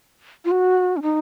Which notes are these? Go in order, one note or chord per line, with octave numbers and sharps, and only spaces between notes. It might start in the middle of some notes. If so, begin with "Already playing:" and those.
F4
F#4
C#4
D#4